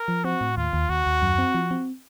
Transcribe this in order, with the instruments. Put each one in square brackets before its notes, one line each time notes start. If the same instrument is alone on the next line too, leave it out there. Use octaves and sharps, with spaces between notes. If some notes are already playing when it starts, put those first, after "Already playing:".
Already playing: [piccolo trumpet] A#4
[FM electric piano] F3
[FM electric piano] C4 [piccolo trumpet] F#4
[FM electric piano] A2
[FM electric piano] D#2 [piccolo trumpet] F4
[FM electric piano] D#2
[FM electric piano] D#2 [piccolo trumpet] F#4
[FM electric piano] D#2
F#2
C4
F3
C4